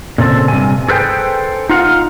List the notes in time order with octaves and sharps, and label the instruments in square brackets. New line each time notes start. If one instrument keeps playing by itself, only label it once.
[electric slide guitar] A#2 C#3 C4 A4
G2 C3 G#5
G#4 A4 B4 C5 E5 G5
D#4 F4 F5 F#5